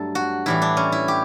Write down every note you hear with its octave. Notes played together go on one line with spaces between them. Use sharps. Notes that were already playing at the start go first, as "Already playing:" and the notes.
Already playing: G2 F#3 A3 A4
F#4
A2 E3 G3 E4
D4
C#4
E4
G4